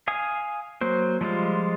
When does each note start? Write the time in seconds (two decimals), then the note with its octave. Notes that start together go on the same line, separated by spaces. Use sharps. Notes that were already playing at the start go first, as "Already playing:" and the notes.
0.08 F5 G#5 D#6
0.81 F#3 A#3 C5
1.21 F3 G3 G#3 F4